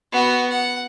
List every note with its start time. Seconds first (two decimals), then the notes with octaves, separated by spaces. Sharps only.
0.12 B3 F#4
0.50 F#5